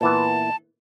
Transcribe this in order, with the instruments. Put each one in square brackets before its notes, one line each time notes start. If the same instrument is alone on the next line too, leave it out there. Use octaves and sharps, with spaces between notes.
[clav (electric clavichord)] A#2 E3 B3 [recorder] A5